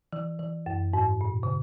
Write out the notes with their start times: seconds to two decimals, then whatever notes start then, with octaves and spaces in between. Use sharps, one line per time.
0.12 E3
0.39 E3
0.66 F#2
0.93 G#2
1.21 A#2
1.43 C#3